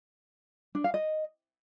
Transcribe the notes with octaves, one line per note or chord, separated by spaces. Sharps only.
D4
F5
D#5